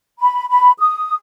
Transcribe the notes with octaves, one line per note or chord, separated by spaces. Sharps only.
B5
B5
D#6